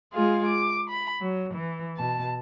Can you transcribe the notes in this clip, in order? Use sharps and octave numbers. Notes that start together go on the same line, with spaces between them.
G#3 F4 G#4 F5
D6
B5
F#3
E3
B2 A5